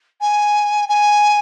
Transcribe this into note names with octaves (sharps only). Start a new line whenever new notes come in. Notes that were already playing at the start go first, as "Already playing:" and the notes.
G#5
G#5